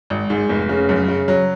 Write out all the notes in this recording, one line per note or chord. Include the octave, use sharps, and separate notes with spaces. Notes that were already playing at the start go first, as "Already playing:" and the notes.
G#1
G#2
F1
C#3
F#2
C#3
F#3